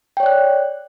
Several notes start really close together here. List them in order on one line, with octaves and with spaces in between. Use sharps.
G5 C#5 D5 F#6